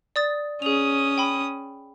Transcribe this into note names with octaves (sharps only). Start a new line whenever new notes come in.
D5 D#6 A6
C#4 G#4 D#6 F7
G5 B5